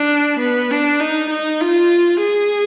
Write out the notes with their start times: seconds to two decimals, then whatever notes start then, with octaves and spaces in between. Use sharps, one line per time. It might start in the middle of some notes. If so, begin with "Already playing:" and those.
Already playing: D4
0.39 B3
0.71 D4
1.00 D#4
1.30 D#4
1.61 F4
2.20 G#4